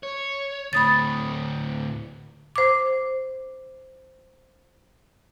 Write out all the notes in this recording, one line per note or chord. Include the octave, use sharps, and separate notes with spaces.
C#5
D2 A2 B5 D#6 A6
C5 D6